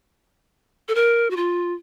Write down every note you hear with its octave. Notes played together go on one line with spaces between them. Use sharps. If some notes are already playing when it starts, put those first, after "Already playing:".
A4
A#4
F#4
F4